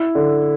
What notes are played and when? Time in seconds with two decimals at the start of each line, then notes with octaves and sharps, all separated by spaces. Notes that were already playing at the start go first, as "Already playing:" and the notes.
Already playing: E4
0.15 D3